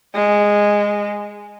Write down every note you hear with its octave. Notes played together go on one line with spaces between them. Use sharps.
G#3